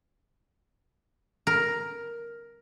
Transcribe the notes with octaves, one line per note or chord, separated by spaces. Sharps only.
A#4